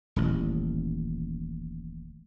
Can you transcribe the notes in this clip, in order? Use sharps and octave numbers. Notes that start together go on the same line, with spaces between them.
D#1 A1